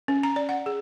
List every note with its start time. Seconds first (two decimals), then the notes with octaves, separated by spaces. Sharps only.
0.08 C#4
0.23 A#5
0.36 D5
0.49 F#5
0.66 G#4